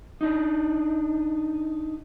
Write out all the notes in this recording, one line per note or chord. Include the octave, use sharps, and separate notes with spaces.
D4 D#4